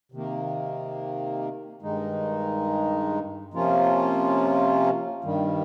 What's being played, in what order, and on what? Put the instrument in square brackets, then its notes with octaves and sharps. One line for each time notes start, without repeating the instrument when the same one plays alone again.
[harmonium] C3 D#3 A#3
G2 D#3 G#3 D#4
C3 F3 A#3 C#4 F4
G2 D#3 G3